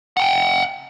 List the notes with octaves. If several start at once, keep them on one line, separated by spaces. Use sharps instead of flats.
F#5 G5